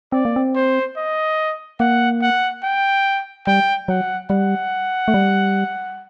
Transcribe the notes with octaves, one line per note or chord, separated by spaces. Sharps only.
C4 D5
A#3
C4
C5
D#5
A#3 F#5
F#5
G5
G3 G5
F#3 F#5
G3 F#5
A3
G3